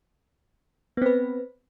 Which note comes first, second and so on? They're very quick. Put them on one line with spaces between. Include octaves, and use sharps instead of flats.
B3 C4 B4